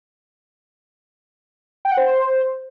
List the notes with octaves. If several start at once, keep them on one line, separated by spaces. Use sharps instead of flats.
G5
F#5
C5